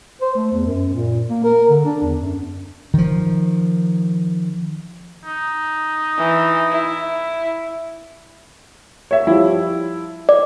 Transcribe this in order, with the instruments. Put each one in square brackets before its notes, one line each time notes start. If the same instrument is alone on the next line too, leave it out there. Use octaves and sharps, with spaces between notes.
[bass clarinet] C5
A3
E2
F#2
A#2
A#3
A#4
D3
D4
E2
F#2
[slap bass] D#3 F3
[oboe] D#4
[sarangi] E3
E4
[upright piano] C#5 E5
F3 G3 E4
[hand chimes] D5